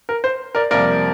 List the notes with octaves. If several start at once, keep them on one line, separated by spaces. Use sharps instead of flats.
A#4
C5
A#4 D5
F2 C3 G3 A#3 A#4 D5